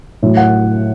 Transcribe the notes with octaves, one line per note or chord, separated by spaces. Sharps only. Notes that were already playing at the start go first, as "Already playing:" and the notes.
A2 F#3
F#5